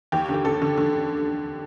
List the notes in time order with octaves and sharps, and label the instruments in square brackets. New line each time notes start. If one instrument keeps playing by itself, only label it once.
[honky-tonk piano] D#2 G4
D3
G4
D3 A4
D3
D3